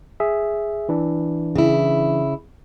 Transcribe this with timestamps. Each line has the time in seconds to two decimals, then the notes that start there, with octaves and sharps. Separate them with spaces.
0.20 G#4 E5
0.89 E3 D4
1.56 C#3 E4